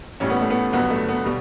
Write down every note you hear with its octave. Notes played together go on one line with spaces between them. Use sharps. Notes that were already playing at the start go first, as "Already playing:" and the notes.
A1 A2 G3 C#4
B3
A3
B3
G1 G2 F#3 B3
A3
B3
B2 G3